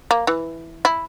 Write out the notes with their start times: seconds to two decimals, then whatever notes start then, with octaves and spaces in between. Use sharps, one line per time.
0.11 A#3
0.27 E3
0.85 E4